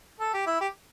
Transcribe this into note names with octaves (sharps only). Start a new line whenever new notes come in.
A4
G4
E4
G4